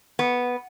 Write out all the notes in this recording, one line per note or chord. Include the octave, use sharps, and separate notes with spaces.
B3